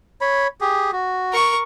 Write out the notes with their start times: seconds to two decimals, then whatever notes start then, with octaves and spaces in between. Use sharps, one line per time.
0.21 C#5 B5
0.61 G4 G#4
0.92 F#4
1.33 A#4 C#6